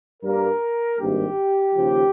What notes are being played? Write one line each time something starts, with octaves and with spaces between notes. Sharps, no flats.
G2 G3 A#3 A#4
G#1 G2 G3 A#3 G4
D#2 C#3 F3